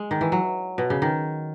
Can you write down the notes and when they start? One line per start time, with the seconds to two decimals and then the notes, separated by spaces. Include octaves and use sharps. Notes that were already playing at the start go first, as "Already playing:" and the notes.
Already playing: G#3
0.11 D#3
0.21 E3
0.32 F#3
0.78 B2
0.90 C#3
1.02 D#3